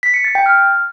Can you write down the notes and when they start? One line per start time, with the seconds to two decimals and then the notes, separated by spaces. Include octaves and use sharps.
0.03 B6
0.14 C#7
0.24 A6
0.35 G5
0.46 F6